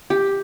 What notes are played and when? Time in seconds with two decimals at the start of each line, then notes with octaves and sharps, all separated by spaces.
0.10 G4